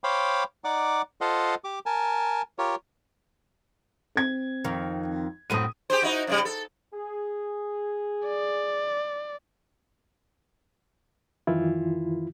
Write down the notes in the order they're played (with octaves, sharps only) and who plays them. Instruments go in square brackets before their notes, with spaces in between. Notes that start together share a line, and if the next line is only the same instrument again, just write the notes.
[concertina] C5 C#5 F5 G5 B5 D6
D#4 D5 F#5 D6
F4 A4 C5 D#5 F5 F#5
G4 D6
A#4 G#5 A5
F4 G4 A#4 C#5
[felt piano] C4 G#6
[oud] F2 D#3
[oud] F#2 A2 C4 [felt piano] D#6 D#7
[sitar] G4 G#4 C5
D#4 E4 F#4
F#2 C#3 G3
A4
[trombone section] G#4
[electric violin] D5
[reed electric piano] F#2 D#3 E3 E4 F4